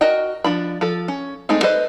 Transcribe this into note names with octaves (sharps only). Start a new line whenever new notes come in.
F#4 A#4 D#5 G5
F3 D4 B5
F3 A4
C#4
G#3 A3 C4 D#4
A4 B4 C5 D#5